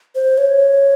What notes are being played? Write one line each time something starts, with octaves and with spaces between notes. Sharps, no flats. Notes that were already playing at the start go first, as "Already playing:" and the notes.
C5
C#5